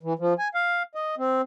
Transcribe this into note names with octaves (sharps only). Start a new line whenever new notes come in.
E3
F3
G#5
F5
D#5
C4